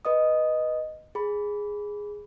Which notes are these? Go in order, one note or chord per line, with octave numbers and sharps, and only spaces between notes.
B4 D#5 D#6
G#4 B5